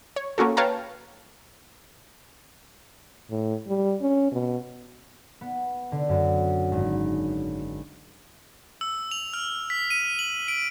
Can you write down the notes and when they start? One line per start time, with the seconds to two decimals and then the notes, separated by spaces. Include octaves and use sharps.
0.16 C#5
0.38 A#3 C#4 F#4 A4
0.57 B4 C#5 F5 G5 A5 A#5
3.30 A2
3.67 G3
4.01 C#4
4.32 B2
5.41 B3
5.92 D3
6.09 F#2
6.72 G#1
8.81 E6
9.11 F7
9.34 F6
9.70 B6
9.90 D#7
10.19 F#7
10.48 D7